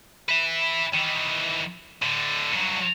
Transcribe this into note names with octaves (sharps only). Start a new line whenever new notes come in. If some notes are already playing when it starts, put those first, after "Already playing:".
B4 E5
D#3 E3
A2 D3
G2 F#3